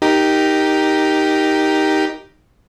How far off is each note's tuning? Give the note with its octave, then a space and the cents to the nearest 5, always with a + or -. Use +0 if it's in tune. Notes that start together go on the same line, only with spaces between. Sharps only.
D#4 +0 G4 +0 A#4 +0